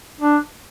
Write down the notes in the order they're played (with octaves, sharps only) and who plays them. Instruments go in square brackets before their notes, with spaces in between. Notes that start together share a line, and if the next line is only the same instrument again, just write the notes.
[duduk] D4